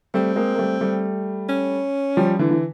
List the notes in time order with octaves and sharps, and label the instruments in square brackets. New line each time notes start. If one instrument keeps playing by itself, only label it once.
[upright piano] G3 A3 [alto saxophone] C4
[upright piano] G#3 A#3
A#3
G3 A3
G3 A3
[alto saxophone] C#4
[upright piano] F3 G3
D3 E3
E3